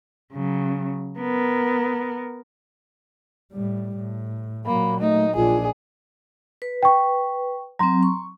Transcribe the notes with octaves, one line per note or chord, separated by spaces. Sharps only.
C#3 F#3
B3 A#4
A2 G3
A2
A#2 F#3 A#3 B5
A3 D#4
A#1 D4 F4 G#4
B4
G5 C#6
F#3 C4 A#5 C6
C#6